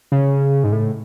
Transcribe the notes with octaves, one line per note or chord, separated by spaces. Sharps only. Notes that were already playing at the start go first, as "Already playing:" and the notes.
C#3
G#2
A2